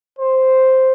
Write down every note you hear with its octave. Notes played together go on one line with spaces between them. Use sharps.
C5